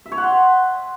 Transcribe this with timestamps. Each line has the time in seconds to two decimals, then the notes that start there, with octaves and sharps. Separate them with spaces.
0.06 E5
0.12 C#5
0.18 F#5
0.24 C6